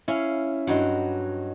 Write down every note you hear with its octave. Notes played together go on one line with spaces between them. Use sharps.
C#4 E4 F5
G2 F#3 F#4 D#5 C6